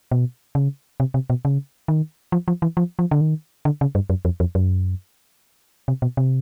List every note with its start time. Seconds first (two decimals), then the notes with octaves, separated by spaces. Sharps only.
0.12 B2
0.55 C#3
1.00 C3
1.14 C3
1.30 B2
1.45 C#3
1.88 D#3
2.32 F3
2.48 F3
2.62 E3
2.77 F3
2.99 F3
3.11 D3
3.21 D#3
3.65 D3
3.81 C#3
3.95 G2
4.10 F#2
4.25 F2
4.40 F2
4.55 F#2
5.88 C3
6.02 B2
6.17 C3